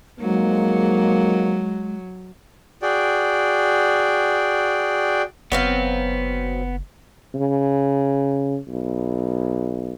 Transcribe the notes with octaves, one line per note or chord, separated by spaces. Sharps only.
F2 G#2 F#3 G#3 A#3
F#4 G#4 D5 G5
F#1 F#3 B3 C4 F5
C#3
B1